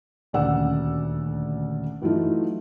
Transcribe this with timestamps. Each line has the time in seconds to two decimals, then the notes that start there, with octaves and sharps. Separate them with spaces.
0.33 D#1 D2 C#4 D5 F#5 E6
2.02 E3 F#3 A3 D#4 F4